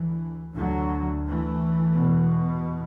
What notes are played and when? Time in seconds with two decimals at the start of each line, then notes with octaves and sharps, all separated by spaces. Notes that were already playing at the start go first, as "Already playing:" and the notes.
Already playing: D2 E3
0.57 D2 D3 F#3
1.26 E3 A3
1.94 E2 B2